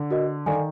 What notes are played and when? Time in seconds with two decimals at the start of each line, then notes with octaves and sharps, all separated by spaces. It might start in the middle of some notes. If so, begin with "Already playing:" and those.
Already playing: D3
0.11 F#4 A#4 D#5
0.46 D#3 A4 D5 F5 G#5